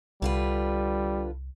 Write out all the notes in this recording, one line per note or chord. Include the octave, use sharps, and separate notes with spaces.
C2 D3 G3 F4 B4